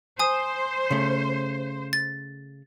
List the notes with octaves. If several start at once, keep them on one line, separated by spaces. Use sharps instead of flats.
C5 G#5 D#6
C#3 A3
A6